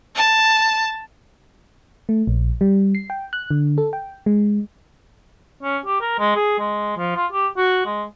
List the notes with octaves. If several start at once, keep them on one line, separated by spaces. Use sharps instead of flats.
A5
A3
A#1
G3
C7
G5
F#6
D3
A4
G5
G#3
C#4
G4
A#4
G#3
G#4
G#3
F3
F4
G4
F#4
G#3